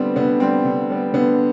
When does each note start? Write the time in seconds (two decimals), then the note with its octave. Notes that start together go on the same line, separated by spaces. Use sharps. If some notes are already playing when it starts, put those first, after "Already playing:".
Already playing: D3 G3 B3 C4
0.16 D3 B3
0.40 G3 B3 C4
0.65 D3
0.90 G3 B3
1.14 D3 B3